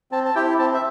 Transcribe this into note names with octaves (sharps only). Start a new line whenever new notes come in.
C4 A5
A5
E4 G4 G5
C4 A5
E5